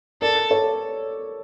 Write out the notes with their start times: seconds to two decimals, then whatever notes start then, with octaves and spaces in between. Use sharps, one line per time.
0.22 A4 A#4 D5
0.51 A4 C#5